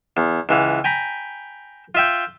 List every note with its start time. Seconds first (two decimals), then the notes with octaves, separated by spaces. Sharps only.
0.17 E2
0.49 C#2 E3 F5
0.84 G5 G#5 A#5 B5
1.95 F4 E5 G5